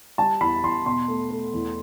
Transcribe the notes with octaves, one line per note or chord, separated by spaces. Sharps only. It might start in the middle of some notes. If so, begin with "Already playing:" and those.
G3 A5
E2 B5
E2 C6
B2 C6
A3
A3
E2